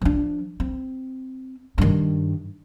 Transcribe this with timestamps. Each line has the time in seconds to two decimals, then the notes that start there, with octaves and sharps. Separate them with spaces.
0.02 F3 D4
0.60 C4
1.78 G2 D#3